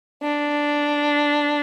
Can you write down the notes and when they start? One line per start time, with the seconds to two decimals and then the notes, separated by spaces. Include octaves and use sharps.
0.23 D4